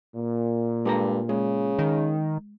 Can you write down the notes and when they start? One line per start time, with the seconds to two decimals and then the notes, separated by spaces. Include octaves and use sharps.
0.15 A#2
0.85 G2 G#3 A4 A#5
1.29 C#3 G#3
1.79 D#3